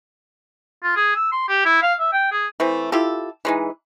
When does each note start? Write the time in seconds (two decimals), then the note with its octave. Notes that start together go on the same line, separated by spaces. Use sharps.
0.83 F4
0.96 G#4
1.16 E6
1.32 C6
1.48 G4
1.65 E4
1.82 F5
2.00 E5
2.13 G5
2.32 G#4
2.60 E3 A3 C4
2.92 E4 F4 G4 A4
3.45 E3 G#3 D#4